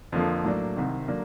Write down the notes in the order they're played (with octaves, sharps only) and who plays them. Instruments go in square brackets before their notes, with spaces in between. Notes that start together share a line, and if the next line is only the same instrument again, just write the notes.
[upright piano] F2 D3 F3 A#3
A2 F#3 A#3 D4
C2 C3 D#3
D3 F#3 A#3 D4